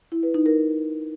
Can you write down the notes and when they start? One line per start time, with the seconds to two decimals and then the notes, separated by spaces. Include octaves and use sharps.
0.12 E4
0.23 B4
0.34 D#4
0.46 A#4